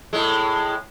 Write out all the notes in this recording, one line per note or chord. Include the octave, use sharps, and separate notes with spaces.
A2 G#3